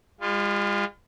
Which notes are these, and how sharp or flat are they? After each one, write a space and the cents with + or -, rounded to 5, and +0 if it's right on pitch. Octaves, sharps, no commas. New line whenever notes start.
G#3 -45 F4 +5